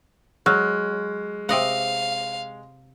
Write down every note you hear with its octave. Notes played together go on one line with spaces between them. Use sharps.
F#3 G#3 C#6 F6 F#6
C3 D#5 F5 F#5